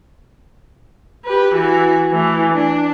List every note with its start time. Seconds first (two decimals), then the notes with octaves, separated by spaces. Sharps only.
1.25 G4 B4
1.55 E3 F#4
2.11 E3 A3
2.53 D4